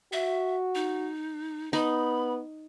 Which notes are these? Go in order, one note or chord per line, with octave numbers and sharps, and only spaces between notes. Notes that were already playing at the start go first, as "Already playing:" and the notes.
F#4 E5
D#4
B3 D#4 B5